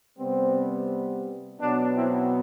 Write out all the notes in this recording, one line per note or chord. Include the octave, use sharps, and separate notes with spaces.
C3 G3 B3 C4
B2 F#3 B3 D4
C4 E4